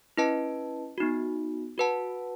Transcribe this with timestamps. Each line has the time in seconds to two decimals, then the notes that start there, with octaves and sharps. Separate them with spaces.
0.17 C#4 E4 B4 D#5 A5
0.98 B3 D#4 F#4
1.78 F#4 B4 F#5 A5